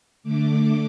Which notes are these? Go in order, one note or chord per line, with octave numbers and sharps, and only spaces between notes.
D3 A3 D6